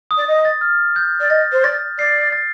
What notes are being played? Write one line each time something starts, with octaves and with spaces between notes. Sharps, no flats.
D#6
D5
D#5
A6
F6
G6
D5
D#5 A6
C5
D5 A#6
D5 C7
A6